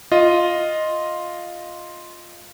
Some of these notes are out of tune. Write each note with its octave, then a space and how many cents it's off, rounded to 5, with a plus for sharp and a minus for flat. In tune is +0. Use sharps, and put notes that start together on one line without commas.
F4 +0 D#5 +0